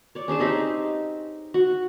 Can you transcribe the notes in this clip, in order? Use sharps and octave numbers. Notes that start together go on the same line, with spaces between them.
C#5 D5
C#4 D4 G#4 A5
C4 D#4 G4 G#4
F#4